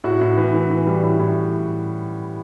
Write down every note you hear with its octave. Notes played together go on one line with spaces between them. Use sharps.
A2 F#4
A2
E3
E3
E3
G3
A2
A2